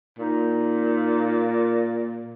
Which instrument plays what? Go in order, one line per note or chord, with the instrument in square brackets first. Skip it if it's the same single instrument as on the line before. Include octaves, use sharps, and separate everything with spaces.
[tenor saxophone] A#2 [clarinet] D#4